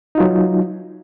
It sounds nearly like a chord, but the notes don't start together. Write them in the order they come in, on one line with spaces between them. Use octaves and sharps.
D#4 F4 F#3